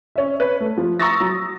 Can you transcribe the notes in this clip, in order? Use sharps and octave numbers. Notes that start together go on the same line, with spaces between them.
C#4 E5
B4 C#5
A3
F3
A#5 C#6 D#6 E6 A6 A#6
F#3